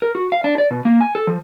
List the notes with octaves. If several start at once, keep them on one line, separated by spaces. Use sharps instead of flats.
A#4
F#4
F5
D4
D5
B2
A#3
G#5
A4
F3